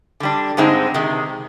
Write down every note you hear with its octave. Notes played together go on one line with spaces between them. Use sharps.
D3 G3 D4
G2 D3 G#3 C4 D#4
C3 D#3 G#3